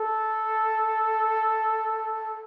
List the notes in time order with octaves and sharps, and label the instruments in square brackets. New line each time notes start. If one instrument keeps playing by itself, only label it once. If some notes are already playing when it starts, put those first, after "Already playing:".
Already playing: [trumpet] A4